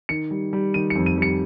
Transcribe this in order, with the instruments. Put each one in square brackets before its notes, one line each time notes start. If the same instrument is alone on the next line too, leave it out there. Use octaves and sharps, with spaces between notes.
[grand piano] D#3 C#7
G3
G3
D#3 D#7
C#7
F2
D#7
G3 C#7